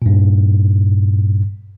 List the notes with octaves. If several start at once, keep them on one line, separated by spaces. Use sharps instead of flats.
G2 A#2